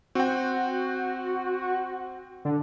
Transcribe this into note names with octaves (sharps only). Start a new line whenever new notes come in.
C4 F#4 G5
D3